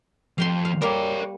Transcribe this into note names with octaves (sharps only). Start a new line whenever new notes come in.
F2 F5 G5 C6
F5
G3 A#3 A#4 C#5